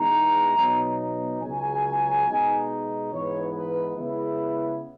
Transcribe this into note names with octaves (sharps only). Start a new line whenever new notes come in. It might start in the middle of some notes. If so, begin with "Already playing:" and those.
Already playing: E2 B2 G#3 D#4 A#5
B2 F#3 B3 D#4
C#2 C#3 F#3 G#5
B2 G#3 D#4
G#2 E3 B3 D#4 C#5
B4
C#3 G#3 B3 E4